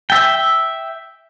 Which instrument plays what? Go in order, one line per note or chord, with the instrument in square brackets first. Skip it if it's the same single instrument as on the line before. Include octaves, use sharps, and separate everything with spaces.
[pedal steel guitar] E5 G5